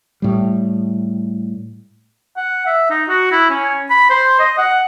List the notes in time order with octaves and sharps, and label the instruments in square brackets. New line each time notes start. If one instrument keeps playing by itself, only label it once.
[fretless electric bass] A2 G3
[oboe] F#5
E5
D#4
F#4
E4
C#4
B5
C5
D#5
F#5